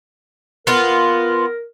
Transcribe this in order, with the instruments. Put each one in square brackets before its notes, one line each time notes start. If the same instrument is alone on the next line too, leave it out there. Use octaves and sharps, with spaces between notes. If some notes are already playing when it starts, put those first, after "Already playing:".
[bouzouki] B3 F4 [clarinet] A#4